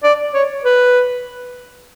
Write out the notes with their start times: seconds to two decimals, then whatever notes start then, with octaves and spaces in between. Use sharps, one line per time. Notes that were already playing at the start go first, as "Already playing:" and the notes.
0.03 D5
0.34 C#5
0.64 B4